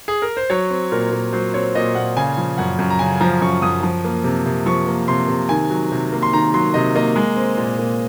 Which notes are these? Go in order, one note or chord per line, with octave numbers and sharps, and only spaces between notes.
G#4
A#4
C5
F#3 C#5
C4
A#2 A#4
A#2
F#3 C5
C4 C#5
A#2 D#5
A#2 F#5
C#3 G#5
F3
F#2 F#5
F#2
A#5
C#3 G#5
F3 A#5
F#2 C#6
F#2 D#6
F3
A#3
C3
C3
F3 C#6
A#3
C3 C6
C3
D#3 G#5
F#3
C3
A#3
C6
D#3 A#5
F#3 C6
C3 D#5
A#3 D#5
G#3
C4
A#2
A#2